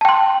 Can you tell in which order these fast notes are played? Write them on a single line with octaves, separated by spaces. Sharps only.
A5 G5 C6